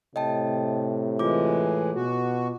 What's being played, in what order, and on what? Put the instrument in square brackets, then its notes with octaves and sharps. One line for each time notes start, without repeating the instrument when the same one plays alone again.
[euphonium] A2 [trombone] C3 [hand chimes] D#5 G5 A5
[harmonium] E3 G#3 [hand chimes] F4 D6
[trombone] B2 [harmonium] F#4